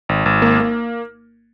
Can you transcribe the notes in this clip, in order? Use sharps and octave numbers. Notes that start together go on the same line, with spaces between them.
G#1
G#1
A#3
A#3